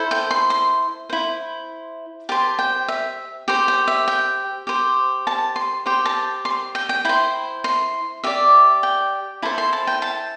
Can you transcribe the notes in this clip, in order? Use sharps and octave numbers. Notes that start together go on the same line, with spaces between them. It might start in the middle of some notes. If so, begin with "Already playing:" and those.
Already playing: E4 A4 C5
G5
C6
C6
E4 C5
G4 C5 A5
G5
E5
G4 C5 G5
G5
E5
G5
G4 C5
A5
C6
G4 C5 G5
A5
C6
G5
G5
E4 C5 G5
C6
G4 D5 E5
G5
E4 A4 C5 A5
C6
A5
G5
A5